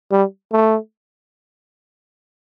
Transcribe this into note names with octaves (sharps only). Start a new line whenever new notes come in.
G3
A3